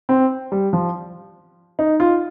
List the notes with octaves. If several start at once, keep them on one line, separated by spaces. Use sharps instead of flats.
C4
G3
F3
D#4
F4